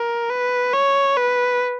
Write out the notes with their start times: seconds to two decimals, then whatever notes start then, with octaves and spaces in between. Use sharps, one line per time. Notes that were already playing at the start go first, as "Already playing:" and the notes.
Already playing: A#4
0.30 B4
0.74 C#5
1.17 B4